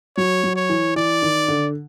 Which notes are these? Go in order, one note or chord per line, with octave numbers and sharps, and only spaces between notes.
F#3 C#5
F#3
C#5
E3
E3 D5
D#3
D3